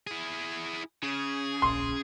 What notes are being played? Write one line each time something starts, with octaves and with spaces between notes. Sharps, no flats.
E4 G#4
C#3 G#4
D1 A#1 C6